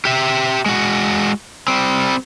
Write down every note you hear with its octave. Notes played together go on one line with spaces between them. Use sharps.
G4 E5
G#3 F#4
G3 C4